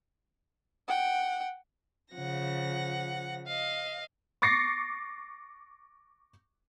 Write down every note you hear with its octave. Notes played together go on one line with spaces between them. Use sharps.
F#5 G5
C#3 F3 F#5 A#6
D#5 F5
C#6 D6 A6 A#6 C7 C#7